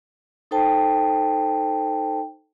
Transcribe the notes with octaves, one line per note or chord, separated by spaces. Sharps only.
D#4 A4 C5 G5 A5